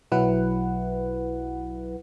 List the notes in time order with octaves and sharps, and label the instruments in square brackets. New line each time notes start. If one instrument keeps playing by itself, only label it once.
[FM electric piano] B1 F#3 E4 B4 F#5